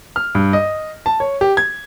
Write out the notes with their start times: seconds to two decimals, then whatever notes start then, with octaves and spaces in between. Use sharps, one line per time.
0.16 F6
0.35 G2
0.53 D#5
1.06 A5
1.20 C#5
1.41 G4
1.57 G#6